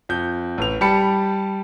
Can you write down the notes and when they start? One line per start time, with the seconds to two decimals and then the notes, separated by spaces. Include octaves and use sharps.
0.09 F2 G6
0.58 A1 F7
0.81 G3 G4 A5 B5 C#7